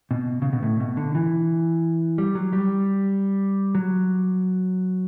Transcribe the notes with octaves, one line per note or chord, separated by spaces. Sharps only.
B2
C#3
B2
A2
B2
D3
E3
G3
F#3
G3
F#3